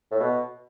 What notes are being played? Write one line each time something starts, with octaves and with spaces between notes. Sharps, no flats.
A2
B2